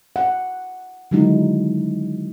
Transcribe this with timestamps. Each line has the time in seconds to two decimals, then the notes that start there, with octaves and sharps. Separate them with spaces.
0.16 F#5
1.11 D3 D#3 F#3 G#3 D#4 E4